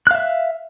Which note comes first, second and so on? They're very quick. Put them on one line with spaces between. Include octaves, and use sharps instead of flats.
F#6 F5 E5